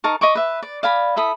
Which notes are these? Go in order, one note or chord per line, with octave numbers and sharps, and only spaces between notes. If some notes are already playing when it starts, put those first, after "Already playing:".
D#4 A#4 A5 C#6
D#5 B5 C#6 D6
B4 E5
D5
D5 F5 G#5 B5
E4 A4 B5 D#6